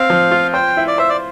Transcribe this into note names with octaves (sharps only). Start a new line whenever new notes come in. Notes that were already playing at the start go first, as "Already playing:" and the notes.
Already playing: C4 F5
F3
F4
C5 G5
E4
D5
C5 E5
D5